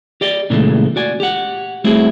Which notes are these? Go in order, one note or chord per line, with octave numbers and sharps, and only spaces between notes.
G4 D5 D#5
A#2 C#3 E3 G#3 A3
F#4 D5 G#5
G4 F#5
G3 A3 C4 E4 F#4 G#4